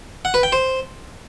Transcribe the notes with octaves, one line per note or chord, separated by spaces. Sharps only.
F#5
B4
G5
C5